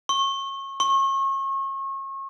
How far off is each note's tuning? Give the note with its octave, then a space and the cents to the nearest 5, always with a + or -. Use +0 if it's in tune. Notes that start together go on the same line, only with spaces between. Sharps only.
C#6 -30
C#6 -35